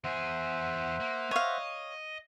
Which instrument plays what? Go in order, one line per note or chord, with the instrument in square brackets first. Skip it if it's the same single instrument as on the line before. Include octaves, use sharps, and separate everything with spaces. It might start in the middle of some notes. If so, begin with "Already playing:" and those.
[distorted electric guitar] E2 G#4 [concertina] C5 E5 F#5
[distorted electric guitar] A#3
[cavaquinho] C#5 F5 [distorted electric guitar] D#5